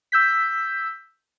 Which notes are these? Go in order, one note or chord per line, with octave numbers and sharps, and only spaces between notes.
E6 G6 B6